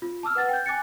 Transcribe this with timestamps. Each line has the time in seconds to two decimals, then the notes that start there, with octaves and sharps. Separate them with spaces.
0.02 F4
0.23 A5 D6 E6 F6
0.36 B4 F#5 A6
0.49 G5 G6
0.66 G#5 D6 F#6 A6 C#7